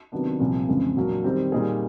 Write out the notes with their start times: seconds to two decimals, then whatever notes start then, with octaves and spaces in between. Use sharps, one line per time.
0.12 C3 D#3 F#3 B3 D4
0.40 C2 A#2 F3
0.68 F2 C#3 E3 G#3 B3
0.97 A#2 F#3 A#3 D4
1.24 D#3 G3 C4
1.52 A#2 G3 A#3 D#4 G#4